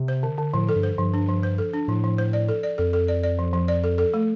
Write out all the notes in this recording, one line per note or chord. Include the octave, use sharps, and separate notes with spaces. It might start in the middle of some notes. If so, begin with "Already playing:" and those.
Already playing: C3
C5
D3
D3
A2 F3
A4
G2
C5
G2 F3
D4
F3
C5
A4
D4
A2 F3
F3
C5
D5
A4
D5
F2 A4
A4
D5
D5
F3
F3
D5
A4
A4
A3